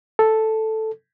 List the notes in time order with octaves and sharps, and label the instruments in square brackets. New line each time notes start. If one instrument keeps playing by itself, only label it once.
[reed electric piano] A4